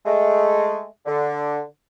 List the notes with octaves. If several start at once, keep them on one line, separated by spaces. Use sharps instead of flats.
G#3 A3
D3